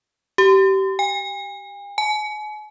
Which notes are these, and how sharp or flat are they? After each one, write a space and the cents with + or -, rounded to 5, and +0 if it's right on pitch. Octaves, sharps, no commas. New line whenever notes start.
G4 -25
G#5 -45
G#5 +40